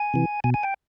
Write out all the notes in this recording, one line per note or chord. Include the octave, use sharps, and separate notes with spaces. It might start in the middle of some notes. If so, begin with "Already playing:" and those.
Already playing: G#5
C3 E3
B2 G#5
G#5
G5